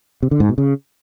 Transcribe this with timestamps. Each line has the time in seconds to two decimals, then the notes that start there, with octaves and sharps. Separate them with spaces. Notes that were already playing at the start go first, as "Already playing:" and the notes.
0.23 C3
0.31 D3
0.40 G#2
0.49 B2
0.58 C#3